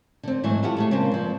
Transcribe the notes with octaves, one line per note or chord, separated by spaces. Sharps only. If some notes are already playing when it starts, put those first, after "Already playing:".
D3 C4
G#2 E3 F#3 A3
E4 F4 G4 A4 F#5
A3 G#4 A4
C#3 G#3 A#3 C4
G2 F3